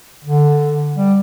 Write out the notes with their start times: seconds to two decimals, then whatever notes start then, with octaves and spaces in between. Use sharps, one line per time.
0.25 D3
0.96 G3